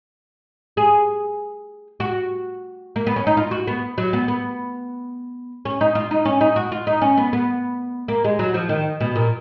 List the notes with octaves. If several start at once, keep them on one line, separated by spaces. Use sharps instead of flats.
G#4
F#4
A#3
B3
C#4
D#4
F4
F#4
B3
F#3
B3
B3
C#4
D#4
F4
D#4
C#4
D#4
F#4
F4
D#4
C#4
B3
B3
A#3
G#3
F#3
F3
D#3
B2
A#2